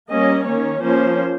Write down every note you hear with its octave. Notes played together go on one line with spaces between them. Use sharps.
G3 A#3 C#4 D#5
D#3 A#3 C#4 C#5
F3 A#3 C#4 C5